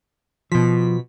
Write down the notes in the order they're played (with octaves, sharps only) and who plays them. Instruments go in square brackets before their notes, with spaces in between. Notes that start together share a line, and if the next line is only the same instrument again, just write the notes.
[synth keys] B2 B6 [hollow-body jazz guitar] F3